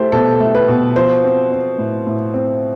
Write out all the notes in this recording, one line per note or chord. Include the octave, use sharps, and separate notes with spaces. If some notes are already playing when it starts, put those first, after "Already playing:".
Already playing: A3 E4 G4 A4 C5
B2 A4
A3
B4
B2
F3 C5
C4
C4
A2
A2
C4